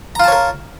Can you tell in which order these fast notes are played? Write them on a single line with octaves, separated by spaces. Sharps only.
A#5 F4 A5 C#5 A#4